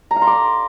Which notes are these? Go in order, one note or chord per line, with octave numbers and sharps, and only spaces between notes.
A#5
F5
C6
D6